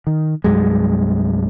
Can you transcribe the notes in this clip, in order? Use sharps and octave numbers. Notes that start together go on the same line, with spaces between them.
D#3
C2 G2 F#3 G#3